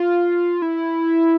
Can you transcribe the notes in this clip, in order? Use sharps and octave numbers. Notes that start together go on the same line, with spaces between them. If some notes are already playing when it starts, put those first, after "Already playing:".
Already playing: F4
E4